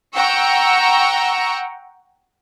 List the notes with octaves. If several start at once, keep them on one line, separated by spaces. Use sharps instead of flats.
F#5 G5 A#5 C#6 E6